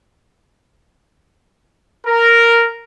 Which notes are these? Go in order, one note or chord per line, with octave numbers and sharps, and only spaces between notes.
A#4